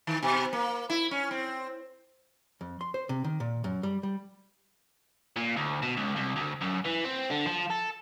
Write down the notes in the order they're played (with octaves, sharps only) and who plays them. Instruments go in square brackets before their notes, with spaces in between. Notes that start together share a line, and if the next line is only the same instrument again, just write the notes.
[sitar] D#3
B2
A#3
E4
C#4
C4
[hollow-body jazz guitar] F2
C6
C5
C3
D#3
A#2
F#2
G3
G3
[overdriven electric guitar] A#2
D2
B2
C#2
C2
D2
F#2
E3
C4
D3
F3
A4